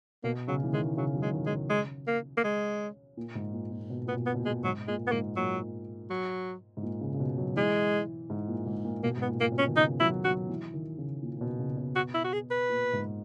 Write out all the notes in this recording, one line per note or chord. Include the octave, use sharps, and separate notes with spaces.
B2 A#3
C#3 F#3
E3
D#3 G#3
C#3 F#3
F#3
G#3
D#3
G#3
C#3
G#3
A#3
A#3
G#3
A#2
G#2
A#2
A#2
B2
A#2 B3
B2
B3
B2
A#2
G#3
G#2 F#3
A#2 G#3
B3
G#2 A#3
A#2 F#3
F#3
G#2
A#2
C#3
C#3
B2
F#3
E3 G#3
G#2
A#2
G#2
A#2
B2 A#3
G#2
B3
A#2
A#2 A#3
B2
C#4
D#3
C#3 D#4
F#3 E4
F#3 F#4
E3
D#3
C#3
A#2
A#2
B2
C#3
B2
F#4
E4
F#4
G#4
B4
A#2
G#2